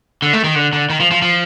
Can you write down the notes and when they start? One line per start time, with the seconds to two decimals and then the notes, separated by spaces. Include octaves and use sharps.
0.22 D3
0.33 A3
0.44 D#3
0.55 D3
0.73 D3
0.90 D#3
1.00 F3
1.11 F3
1.22 F3